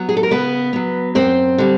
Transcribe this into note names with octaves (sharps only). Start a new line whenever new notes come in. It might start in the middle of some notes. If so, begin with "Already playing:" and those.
Already playing: F#3 B3
G#4
A4
A#4
C#3 B3 B4
F#3 B3
F#2 C4 C5
D3 G3